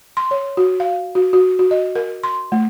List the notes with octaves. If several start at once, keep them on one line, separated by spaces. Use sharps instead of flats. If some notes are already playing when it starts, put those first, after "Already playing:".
C6
C#5
F#4
F5
F#4
F#4
F#4
D#5
A#4
C6
A3